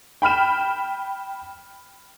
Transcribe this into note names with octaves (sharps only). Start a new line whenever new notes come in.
G5 B5 F6 E7